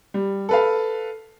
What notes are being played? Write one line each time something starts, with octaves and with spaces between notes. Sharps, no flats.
G3
A4 B4 F5